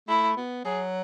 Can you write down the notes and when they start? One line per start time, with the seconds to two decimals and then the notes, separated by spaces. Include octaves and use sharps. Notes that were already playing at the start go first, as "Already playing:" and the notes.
0.08 A3 E4
0.37 B3
0.65 F#3 G#4